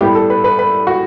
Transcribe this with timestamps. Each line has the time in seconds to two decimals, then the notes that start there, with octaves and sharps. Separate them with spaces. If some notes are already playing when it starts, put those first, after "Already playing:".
0.01 A2 G3 B3 G4
0.15 A4
0.30 B4
0.44 B4
0.59 B4
0.87 F#4